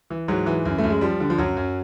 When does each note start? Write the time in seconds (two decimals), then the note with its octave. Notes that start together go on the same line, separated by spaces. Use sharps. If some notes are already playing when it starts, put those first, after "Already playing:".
0.10 E3
0.28 G#2 F#3
0.46 E3
0.65 F#2
0.78 A3
0.84 F#2
0.90 G#3
1.01 F3 G3
1.20 D3
1.30 F3
1.38 F#2 F#3
1.57 F#2